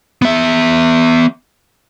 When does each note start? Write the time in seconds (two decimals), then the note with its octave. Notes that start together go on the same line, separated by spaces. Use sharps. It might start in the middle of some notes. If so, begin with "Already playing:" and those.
0.22 B3 E5